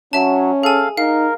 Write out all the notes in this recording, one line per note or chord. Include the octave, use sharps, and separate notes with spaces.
F#3 C#4 E5 A5
G#4 A4 F5 G#5
D#4 A#4 F5